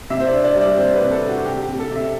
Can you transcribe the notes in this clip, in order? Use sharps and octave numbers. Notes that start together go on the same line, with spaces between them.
C3 E5
C5
D5
D4
D5
G3
D5
C3 C5
B4
C3
A4
C3
F#4
C3 G4
G4
C3
A4
C3 E5